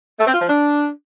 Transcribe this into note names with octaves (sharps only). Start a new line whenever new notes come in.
A3
C4
F4
F3
D4